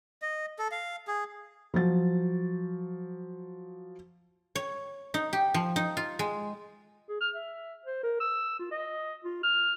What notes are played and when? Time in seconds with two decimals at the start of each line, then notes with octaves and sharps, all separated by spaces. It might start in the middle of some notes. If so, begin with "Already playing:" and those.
0.22 D#5
0.59 A4
0.72 F5
1.08 G#4
1.74 F3 F#3 A6
4.55 C#5
5.14 D#4
5.33 G4
5.54 F3
5.76 D#4
5.97 F4
6.19 G#3
7.09 G#4
7.21 F6
7.35 E5
7.86 C5
8.03 A#4
8.21 E6
8.59 F4
8.71 D#5
9.25 F4
9.44 F6